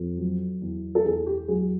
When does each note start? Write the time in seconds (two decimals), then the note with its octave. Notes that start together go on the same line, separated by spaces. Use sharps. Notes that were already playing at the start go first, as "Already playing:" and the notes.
Already playing: F2
0.17 F#3
0.61 E2
0.95 A4
1.05 E2 G#4
1.27 G4
1.48 F#3 G#4